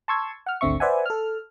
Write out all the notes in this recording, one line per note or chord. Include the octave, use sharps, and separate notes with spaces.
A5 C6 C#6 E6 G#6
F#5 F6
G#1 D2 D3 C4 E5 C#6
B4 C5 D5 E5 F#5 G#5
A4 F6